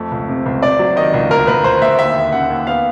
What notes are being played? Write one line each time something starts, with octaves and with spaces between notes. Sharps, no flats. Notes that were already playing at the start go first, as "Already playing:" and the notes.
Already playing: F2 A3
C#2
C3
C#2
C3 D5
F#3
D#3 D#5
C#2
D2 A#4
D2 B4
D2 C5
D2 E5
D#2 E5
D#2
C#3 F#5
D#2
B3 F5